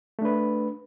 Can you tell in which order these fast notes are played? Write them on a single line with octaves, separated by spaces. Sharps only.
A3 D4 B4